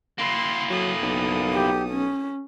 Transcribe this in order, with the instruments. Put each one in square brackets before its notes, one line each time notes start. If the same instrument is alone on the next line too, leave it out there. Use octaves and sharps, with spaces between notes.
[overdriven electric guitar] A#3 E4 [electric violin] C6
[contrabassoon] F#3 [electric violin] A4 D#6
[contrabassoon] B1
[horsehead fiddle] G4
C#4